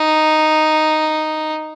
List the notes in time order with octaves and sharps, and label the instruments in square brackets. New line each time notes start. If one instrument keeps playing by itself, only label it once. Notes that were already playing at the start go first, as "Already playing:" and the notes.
Already playing: [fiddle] D#4